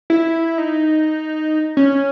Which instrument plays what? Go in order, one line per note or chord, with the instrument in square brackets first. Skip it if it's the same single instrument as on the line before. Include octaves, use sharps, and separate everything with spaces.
[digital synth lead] E4
D#4
C#4